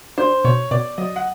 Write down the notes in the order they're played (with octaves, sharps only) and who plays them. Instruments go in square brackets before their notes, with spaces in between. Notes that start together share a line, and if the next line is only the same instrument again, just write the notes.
[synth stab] D4 [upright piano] C5
[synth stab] B2 [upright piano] C#5
[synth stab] B2 [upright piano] D5
[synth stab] F#3 [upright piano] D#5
[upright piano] F#5